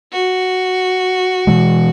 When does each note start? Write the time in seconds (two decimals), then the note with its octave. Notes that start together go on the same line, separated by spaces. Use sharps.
0.12 F#4
1.47 B2 E3 G#3